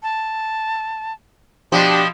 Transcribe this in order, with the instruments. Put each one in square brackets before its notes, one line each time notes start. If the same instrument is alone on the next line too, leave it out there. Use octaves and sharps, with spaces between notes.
[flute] A5
[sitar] B2 F3 [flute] D4 [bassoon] G4